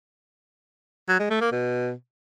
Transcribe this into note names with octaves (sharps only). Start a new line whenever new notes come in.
F#3
G#3
A3
A#3
B2